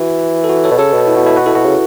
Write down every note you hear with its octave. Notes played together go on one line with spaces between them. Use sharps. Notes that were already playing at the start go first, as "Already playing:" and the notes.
Already playing: E3 F#4
A4
F#4
A4 C#5
B2
C#3 A4 C#5
B2
E4
F#4
E4 A4
F#4 B4
E4 A4
B2 F#4
C#3